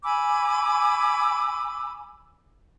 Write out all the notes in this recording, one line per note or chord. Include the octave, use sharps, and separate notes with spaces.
G#5 B5 D6 E6